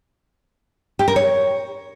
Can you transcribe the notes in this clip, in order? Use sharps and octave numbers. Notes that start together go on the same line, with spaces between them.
G4
A#4
C#5